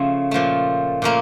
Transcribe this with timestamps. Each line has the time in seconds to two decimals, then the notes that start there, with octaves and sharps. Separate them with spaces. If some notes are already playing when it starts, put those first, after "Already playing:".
Already playing: C#3 F3 A3
0.31 A#2 F3 A3
1.02 A#2 F3 A3 A#3